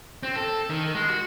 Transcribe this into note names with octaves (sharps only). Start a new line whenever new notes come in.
C4
A4
D#3
G#3
F#4